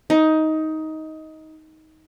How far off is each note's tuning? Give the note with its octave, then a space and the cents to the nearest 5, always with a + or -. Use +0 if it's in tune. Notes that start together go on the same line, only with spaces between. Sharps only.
D#4 +15